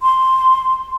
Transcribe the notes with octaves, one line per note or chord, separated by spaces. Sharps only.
C6